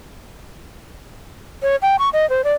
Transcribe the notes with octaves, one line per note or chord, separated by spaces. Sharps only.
C#5
G5
C#6
D#5
C5
D5